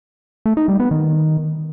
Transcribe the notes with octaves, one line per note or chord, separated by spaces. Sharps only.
A3
D#4
G3
B3
D#3